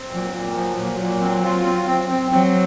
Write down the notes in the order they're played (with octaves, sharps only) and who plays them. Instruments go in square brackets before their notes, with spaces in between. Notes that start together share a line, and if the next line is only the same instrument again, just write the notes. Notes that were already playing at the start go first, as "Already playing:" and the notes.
Already playing: [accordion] C4
[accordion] A#2 [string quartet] F#3
[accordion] A#2
[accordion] F3 [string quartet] F#3
[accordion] A#2
A#2
C4
F4
C4
C4
C4
[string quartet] F#3 [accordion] C4